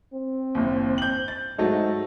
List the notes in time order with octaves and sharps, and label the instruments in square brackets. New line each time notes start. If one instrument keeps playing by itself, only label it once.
[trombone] C4
[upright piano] F#1 D#2
G6 F#7
A6
[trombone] G#2 [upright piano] F#3 A3 D#4